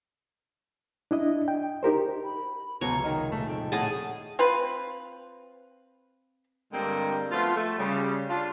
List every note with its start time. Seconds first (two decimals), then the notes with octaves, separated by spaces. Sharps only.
1.11 D4 E4 D#5
1.48 G5
1.83 D#4 G4 A#4 C5
2.24 B5
2.81 F1 C#2 B2 C#5 A#5
3.04 D#3 G#4 D#5
3.32 D#1 A3
3.49 F2 G5
3.72 A2 C#4 G#4 D#5 F#5 A5
4.39 C4 F4 B4
6.73 G2 D3 G3 G#3 A#3 C4
7.31 F3 A3 B3 F4
7.56 A3
7.78 C#3 G3
8.29 D4 F4